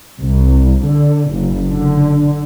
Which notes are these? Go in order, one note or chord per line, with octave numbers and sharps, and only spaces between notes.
C2
D3
F#1
D3